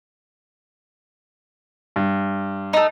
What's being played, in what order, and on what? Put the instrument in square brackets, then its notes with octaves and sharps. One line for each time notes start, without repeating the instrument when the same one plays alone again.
[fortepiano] G2
[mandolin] A3 D#4